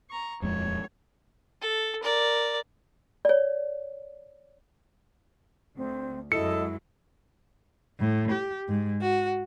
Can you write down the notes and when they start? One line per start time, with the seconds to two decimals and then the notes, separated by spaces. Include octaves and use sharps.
0.10 A#5 C#6
0.42 D#1 F2 G#3 C#5
1.62 A4
2.03 A#4 D5
3.25 C#5 D5
5.77 D2 C4
6.32 F#2 F#3 G#3 E4 A4 D#5 C#7
8.00 A2
8.31 G4
8.69 G#2
9.02 F#4